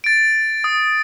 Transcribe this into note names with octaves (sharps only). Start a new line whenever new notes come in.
A6 D7
D#6